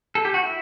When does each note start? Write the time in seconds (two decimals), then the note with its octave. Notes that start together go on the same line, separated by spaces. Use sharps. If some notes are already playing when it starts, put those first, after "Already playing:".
0.15 A4
0.25 G4
0.34 F#4
0.43 E4